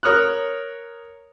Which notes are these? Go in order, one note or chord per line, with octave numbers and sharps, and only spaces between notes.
A#4 C#5 D#6 F6 F#6